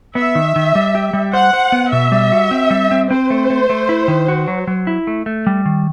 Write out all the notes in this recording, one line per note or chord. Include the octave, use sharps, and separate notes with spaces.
B3 E5
D#3
D#3
G3
G4
G3
C5 F#5
C5
B3
B2 E5
G3
F#4
C4
G3
C4
C4 C5
A3
A3
A3
E4
D#3
F#4
F#3
F#3
E4
A3
A3
G3
D#3